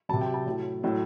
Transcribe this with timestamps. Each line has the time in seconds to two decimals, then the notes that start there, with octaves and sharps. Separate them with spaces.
0.09 F#3 A5
0.13 C3
0.21 G5
0.34 A5
0.46 A2 F#3
0.84 A2 F#3